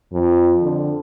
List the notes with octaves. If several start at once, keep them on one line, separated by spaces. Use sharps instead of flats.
F2
D3